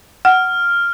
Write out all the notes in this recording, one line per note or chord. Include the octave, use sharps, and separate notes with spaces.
F#5 F6